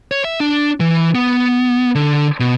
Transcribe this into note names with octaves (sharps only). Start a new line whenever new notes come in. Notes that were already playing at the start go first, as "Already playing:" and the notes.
C#5
E5
D4
E3
B3
D3
B2